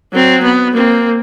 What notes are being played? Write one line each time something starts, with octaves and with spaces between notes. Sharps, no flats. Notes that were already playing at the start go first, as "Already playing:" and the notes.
F#3 C4
B3
A#3 C4